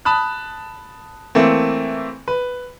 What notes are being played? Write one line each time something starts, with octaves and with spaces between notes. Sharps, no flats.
A5 B5 D#6 F#6
E3 A3 A#3 C4
B4